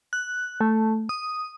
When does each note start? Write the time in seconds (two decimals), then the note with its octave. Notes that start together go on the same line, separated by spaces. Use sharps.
0.13 F#6
0.61 A3
1.09 D#6